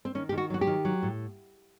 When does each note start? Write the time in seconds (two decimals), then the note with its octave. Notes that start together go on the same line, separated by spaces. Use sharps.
0.05 C4
0.15 D#3 C#4
0.29 G4
0.32 D#3
0.38 F#4
0.50 F#3 F#4
0.61 G4
0.67 D#3
0.85 F#3
1.03 A2